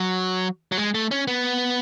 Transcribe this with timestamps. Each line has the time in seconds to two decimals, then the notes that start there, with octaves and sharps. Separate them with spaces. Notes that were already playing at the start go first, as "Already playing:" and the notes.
Already playing: F#3
0.72 F#3
0.77 G#3
0.94 A3
1.11 C#4
1.27 B3